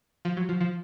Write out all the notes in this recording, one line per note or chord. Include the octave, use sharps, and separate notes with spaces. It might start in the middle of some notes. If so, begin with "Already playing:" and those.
F3
F#3
F3
F3